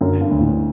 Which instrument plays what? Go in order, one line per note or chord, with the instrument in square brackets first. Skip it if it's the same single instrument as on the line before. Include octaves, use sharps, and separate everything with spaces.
[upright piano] F#2 [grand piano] D3
[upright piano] G2
[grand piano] D2
[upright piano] A2